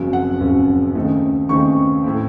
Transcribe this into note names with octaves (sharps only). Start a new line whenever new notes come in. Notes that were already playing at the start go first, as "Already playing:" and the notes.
Already playing: F#1 F2 C#3 F#3
F#5
F#1 F2 C#3 F#3
D#2 C#3 A3 C4 D#4
D#2 C#3 A3 C4 D#4 C#6
A2 A3 C4